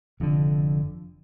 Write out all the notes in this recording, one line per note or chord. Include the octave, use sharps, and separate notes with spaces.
F1 F2 D3